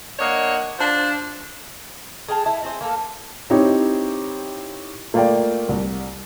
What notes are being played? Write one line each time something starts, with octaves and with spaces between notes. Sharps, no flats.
A#3 D4 C#5 D#5 F#5
D4 F4 C5
G#4 F5 G5 A5
E4
C4 G#4 C5
A#3 A4
C4 D#4 E4 G4 C#5
A3 A#3 F4 D5 G5
C2